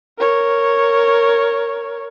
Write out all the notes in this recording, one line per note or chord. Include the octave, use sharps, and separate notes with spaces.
A#4 C#5